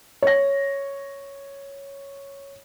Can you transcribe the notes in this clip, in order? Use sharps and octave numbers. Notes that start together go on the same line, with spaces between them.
C#5 A#6